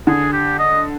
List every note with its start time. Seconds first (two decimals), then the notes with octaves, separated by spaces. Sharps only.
0.07 D3 G#4
0.33 G4
0.59 D#5